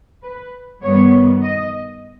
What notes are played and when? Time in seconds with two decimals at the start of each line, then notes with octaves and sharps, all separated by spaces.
0.23 B4
0.82 G2 D#3 G3 B3 C#5
1.42 D#5